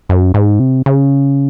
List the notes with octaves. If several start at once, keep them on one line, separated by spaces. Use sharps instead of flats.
F#2
G#2
C3
C#3